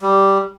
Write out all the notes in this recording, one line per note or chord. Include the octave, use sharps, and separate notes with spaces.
G3